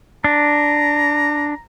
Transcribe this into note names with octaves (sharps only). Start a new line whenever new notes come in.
D4 A#5